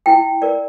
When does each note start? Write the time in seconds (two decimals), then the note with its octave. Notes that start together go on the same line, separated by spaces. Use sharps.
0.06 E4 G5
0.42 A#4 D5